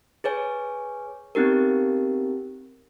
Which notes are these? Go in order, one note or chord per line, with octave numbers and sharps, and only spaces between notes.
G#4 B4 C#5 G#5
B3 C4 D#4 G4 A#4